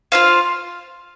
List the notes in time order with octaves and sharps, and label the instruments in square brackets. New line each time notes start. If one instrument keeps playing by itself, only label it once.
[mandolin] F4 C5 F5